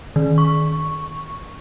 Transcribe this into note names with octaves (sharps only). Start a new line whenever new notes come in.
D#3
C#6